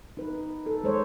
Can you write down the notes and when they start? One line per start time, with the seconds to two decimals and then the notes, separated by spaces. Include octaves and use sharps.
0.17 D#4 B4
0.66 A4
0.84 G#3 C5 C#5